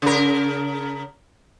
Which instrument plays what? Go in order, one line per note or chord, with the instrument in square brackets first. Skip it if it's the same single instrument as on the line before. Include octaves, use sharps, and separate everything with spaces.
[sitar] C#3 A#4